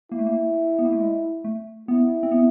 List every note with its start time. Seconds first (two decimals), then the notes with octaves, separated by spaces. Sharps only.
0.12 A#3 E4
0.19 A3
0.27 A#3
0.79 B3
0.85 A#3
0.93 A3
1.00 G#3
1.44 A3
1.88 B3 E4
2.23 C4
2.32 B3